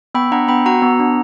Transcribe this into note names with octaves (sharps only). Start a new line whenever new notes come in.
B3 G5 B5
D4 F#5 A#5
B3 G5 B5
F#4 F#5 A#5
B3
D4